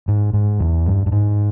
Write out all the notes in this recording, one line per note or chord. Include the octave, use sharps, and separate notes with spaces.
G#2
G#2
E2
G2
G2
G#2